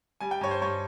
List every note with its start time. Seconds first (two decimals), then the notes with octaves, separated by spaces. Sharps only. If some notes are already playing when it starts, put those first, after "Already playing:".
0.20 G3 G#5
0.31 G5
0.41 G2 C#5
0.51 C5
0.62 G2 C#5